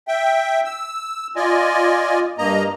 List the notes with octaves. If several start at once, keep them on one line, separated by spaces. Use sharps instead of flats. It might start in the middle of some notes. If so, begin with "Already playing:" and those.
E5 G5
E6
F4 D5 D#5 G#5
G2 A#3 D#5 A#5